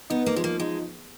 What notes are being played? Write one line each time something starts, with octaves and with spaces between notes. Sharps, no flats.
B3 D#4
A#3
F3 G#3
A#3
G#3 D#4